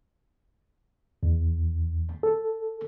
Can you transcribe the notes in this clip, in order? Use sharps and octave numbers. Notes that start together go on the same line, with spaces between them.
E2
A4